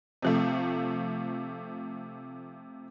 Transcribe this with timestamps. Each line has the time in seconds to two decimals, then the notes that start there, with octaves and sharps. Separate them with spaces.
0.22 C3 F3 A3